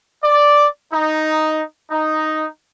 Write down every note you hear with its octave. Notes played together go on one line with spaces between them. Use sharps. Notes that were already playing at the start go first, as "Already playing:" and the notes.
D5
D#4
D#4